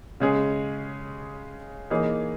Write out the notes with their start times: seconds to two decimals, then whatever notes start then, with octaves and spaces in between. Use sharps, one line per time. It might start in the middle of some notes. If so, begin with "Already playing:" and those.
0.20 C#3 G#3 C#4 G#4
1.90 E3 A#3 D#4 G#4 C#5